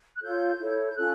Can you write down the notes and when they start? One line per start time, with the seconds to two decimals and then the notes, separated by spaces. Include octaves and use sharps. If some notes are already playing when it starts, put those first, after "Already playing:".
0.15 F#6
0.23 F4 A4 C#5 G6
0.59 E4 A4 C#5
0.88 G6
0.96 C#4 F4 A4 F#6